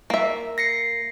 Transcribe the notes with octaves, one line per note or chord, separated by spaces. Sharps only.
A#3 E5
A#6 C7 C#7